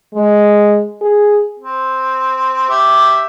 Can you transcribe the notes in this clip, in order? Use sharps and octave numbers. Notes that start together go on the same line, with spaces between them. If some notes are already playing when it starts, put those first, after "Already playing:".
G#3
G#4
C4
G4 E5